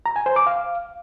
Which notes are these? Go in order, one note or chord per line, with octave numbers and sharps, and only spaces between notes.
A#5
G#5
C5
D6
F5